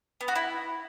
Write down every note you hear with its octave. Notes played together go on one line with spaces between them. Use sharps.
B3
F#4
E4